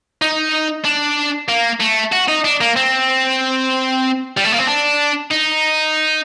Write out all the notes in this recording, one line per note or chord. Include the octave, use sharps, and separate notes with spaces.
D#4
D4
A#3
A3
F#4
D#4
D4
A#3
C4
G3
A3
A#3
C4
D4
D#4